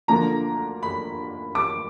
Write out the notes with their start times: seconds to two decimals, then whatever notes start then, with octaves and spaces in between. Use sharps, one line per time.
0.08 D2 D3 F3 A#3 D4 A#5
0.83 B5
1.55 D6